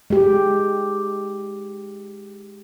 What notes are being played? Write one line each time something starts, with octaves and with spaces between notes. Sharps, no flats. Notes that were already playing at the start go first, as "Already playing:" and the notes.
G#3 G4